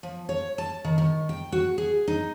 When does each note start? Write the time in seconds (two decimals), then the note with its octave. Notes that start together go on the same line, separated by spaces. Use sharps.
0.03 F3
0.29 C#5
0.58 A5
0.85 D#3
0.98 D#3
1.29 G5
1.52 F#4
1.78 G#4
2.08 D#4